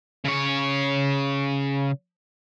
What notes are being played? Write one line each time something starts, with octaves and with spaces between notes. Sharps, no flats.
C#3 C#5